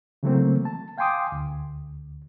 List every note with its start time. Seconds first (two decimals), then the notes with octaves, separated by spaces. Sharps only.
0.23 C#3 E3 F#3 A3 A#3 C4
0.65 A5
0.98 F5 G5 G#5 C6 D6 D#6
1.32 D2